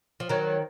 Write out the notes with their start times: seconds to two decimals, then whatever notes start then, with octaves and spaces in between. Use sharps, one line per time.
0.20 F3
0.29 D#3 F#3